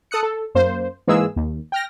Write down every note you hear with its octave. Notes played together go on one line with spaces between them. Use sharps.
A4 D#6 F#6 C#7
A4
F#2 A#3 C5
G#2 E3 G#3 A#3 G#4 E6
D#2
G5 F6 A#6